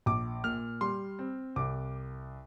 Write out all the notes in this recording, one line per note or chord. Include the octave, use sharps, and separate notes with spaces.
A#1 D6
A#2 F6
G3 C6
C4
C2 D6